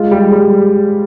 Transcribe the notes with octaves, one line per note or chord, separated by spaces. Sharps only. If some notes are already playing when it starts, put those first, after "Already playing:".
Already playing: G#3 F4
G3
G3